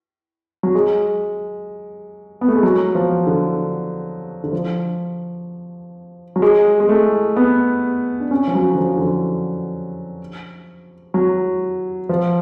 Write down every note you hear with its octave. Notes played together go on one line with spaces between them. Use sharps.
F#3
G#3
B3
A3
G#3
F#3
F3
D3
D3
F3
F#3
G#3
G#3
A3
B3
D4
C#4
F3
F#3
D3
F3
D3
F3
F#3
F3